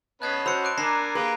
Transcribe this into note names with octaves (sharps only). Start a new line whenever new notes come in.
B3 C#4 B4 D#5 A5 F#6 G#6 C7
C#4 F#4 C5 B5 E6 C#7
D6 F#6 D7
D4 A#4 D5 G#5 A#5 A#6 C7
A#3 G4 G#4 B4 A#5